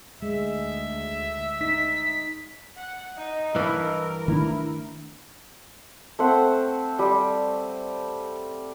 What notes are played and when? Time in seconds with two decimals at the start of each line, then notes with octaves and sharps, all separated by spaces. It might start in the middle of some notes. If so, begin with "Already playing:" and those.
0.22 D2 G#3 E5
1.61 D#4 B6
2.78 F#5
3.17 D#4 D#5
3.55 G2 E3 A#4
4.28 D#3 A3 D4 E4
6.19 A3 C4 C5 F#5
6.99 G3